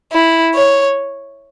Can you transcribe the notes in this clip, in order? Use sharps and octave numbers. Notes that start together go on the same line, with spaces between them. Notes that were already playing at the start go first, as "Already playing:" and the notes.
E4
C#5